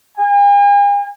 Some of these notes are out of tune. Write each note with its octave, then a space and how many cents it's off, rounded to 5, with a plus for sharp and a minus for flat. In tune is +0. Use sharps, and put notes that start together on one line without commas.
G#5 -45